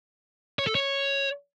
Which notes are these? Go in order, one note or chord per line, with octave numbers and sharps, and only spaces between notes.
C#5
A4
C#5